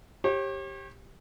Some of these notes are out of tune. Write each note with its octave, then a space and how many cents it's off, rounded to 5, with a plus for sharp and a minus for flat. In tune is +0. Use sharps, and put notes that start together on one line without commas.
G4 +0 C#5 -40